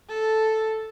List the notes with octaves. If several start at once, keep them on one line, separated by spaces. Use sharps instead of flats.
A4